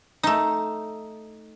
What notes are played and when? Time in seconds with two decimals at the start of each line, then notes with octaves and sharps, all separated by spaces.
0.23 A3 D#4